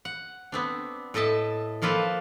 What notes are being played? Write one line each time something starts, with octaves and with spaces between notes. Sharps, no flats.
F#5
B3 C4 D4
A2 A4 D#5 E5 A5
F3 A#3 F4 A4 B4 C5